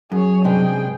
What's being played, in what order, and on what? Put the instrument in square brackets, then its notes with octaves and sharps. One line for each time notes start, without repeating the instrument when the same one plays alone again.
[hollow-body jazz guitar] F#2 [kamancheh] G#4 C#5
[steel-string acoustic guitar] G2 C3 G#3 [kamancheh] G#4 G5